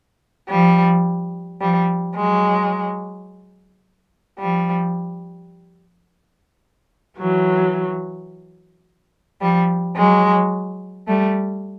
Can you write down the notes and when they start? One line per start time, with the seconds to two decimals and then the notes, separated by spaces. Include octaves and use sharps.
0.50 F3 G3
1.61 F3 G3
2.17 F#3 G#3
4.40 F3 G3
7.18 E3 F#3
9.41 F3 G3
9.97 F#3 G#3
11.08 G3 A3